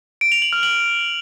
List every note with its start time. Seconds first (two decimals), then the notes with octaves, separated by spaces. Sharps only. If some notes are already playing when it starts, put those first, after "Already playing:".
0.21 D7
0.32 F7
0.42 F#7
0.53 F6
0.63 F#7